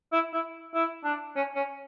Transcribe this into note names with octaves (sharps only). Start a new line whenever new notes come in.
E4
E4
E4
D4
C#4
C#4